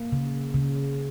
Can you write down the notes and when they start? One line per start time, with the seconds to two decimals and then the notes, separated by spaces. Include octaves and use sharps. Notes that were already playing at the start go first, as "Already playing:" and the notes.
Already playing: A#3
0.12 C#3
0.54 C#3